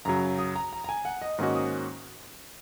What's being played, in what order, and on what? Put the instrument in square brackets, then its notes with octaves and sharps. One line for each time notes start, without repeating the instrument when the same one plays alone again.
[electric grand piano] F#2 C#3 F#3 [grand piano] A#5
[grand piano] D#6
A#5
A#5
A#5
G#5
F#5
D#5
[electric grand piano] G#2 D#3 A#3 C#4 F#4 [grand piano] D#5
[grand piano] D#6